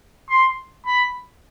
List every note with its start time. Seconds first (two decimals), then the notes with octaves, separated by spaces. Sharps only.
0.30 C6
0.87 B5